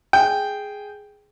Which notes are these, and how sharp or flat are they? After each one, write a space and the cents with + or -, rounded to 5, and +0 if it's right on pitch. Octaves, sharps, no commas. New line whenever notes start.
G#4 +0 G5 +0